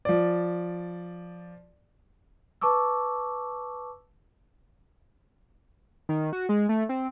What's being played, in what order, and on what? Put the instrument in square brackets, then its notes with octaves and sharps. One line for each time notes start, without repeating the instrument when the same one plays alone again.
[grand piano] F3 D5
[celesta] B4 A5 C#6 D6 E6
[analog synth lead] D#3
F#4
G#3
A3
C4